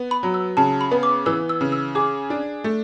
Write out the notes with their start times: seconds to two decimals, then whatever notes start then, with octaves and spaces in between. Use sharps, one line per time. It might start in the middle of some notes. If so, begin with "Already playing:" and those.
Already playing: B3
0.11 B5
0.23 F#3
0.34 E6
0.57 C#3 A5
0.81 B5
0.91 B3
1.03 D6
1.26 E3 E6
1.49 E6
1.61 C#3
1.72 E6
1.95 G#4 D6
2.30 D4
2.64 A3